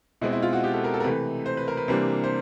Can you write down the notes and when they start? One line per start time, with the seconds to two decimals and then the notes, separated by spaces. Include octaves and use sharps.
0.21 B2 G#3 C4 E4
0.32 E4
0.42 F4
0.53 F#4
0.64 G4
0.74 A4
0.84 A#4
0.94 A4
1.00 A#4
1.04 C3 E3 A3 B4
1.46 C5
1.57 B4
1.68 A#4
1.77 B4
1.88 C3 E3 G3 A#3 D4 C5
2.24 C5